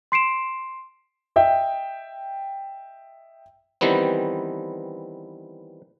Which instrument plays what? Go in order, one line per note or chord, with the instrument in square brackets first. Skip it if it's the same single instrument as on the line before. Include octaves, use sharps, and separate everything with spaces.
[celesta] C6 C7 D7 E7
[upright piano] D#5 E5 G5
[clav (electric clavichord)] D#3 E3 G3 B3 C4